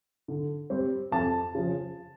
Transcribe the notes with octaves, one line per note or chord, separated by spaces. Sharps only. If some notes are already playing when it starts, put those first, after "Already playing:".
D3
G3 C4
F2 A5
C#3 F3